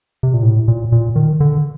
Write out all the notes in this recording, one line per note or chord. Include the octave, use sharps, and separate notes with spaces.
C3
A#2
A2
A#2
A#2
D#3
D3